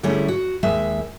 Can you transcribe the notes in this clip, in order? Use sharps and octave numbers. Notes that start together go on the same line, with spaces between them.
D3 G3 A3 C#4 E4 G#4
F#4
D#2 G#3 E5